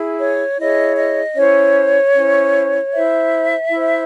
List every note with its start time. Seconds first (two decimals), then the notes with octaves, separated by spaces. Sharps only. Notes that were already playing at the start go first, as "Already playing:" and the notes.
Already playing: E4 G#4
0.20 C#5
0.58 E4 G#4 C#5 D#5
0.97 D#5
1.36 C#4 E4 C5 C#5
2.14 C#4 E4 C5
2.93 E4 C5 E5
3.71 E4 C5